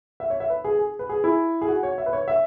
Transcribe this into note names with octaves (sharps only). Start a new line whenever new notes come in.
E5
C#5
E5
B4
G#4
G#4
B4
G#4
E4
G#4
F#4
C#5
E5
B4
C#5
E5